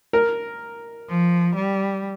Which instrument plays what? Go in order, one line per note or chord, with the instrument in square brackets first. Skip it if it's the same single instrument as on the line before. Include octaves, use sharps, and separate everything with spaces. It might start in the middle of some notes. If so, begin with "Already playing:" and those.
[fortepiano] A#4
[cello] F3
G3